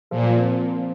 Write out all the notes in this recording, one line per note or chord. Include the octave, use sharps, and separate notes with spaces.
A#2 F3
C4